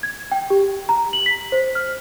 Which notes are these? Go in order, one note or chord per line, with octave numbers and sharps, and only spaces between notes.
G#6
G5
G4
A#5
F#7
B6
C5
F6